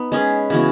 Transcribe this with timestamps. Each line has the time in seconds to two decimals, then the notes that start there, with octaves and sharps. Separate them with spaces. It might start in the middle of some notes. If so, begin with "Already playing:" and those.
Already playing: B3 D#4
0.12 G#3 C#4 G#4 B4
0.50 C#3 E3 B3 F#4